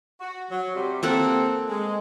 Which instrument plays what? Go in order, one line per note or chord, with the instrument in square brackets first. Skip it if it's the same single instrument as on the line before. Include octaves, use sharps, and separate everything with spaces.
[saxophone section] F#4
F#3
C3 G3
[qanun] A#3 A4 F#5 [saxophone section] C4
[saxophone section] G#3